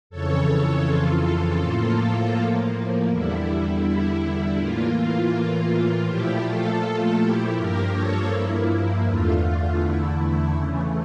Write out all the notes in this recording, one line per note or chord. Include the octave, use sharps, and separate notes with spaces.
F2 C#3 E3 A4 C#5
F4 A4
A2 F3 A#3
E2 D3 G3 E4
E4
A2 E3 A#3 F4
F4
A#2 F3 A3 E4 G4
F4 A4
E4 G4
G2 F3 A#3 G4 A#4
A4 C#5
E4
E2 D3 A3 F4
F4
E4
E4
C#3 E3 A3